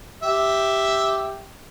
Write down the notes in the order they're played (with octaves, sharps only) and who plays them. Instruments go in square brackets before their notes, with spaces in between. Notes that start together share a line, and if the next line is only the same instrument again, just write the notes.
[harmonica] G4 E5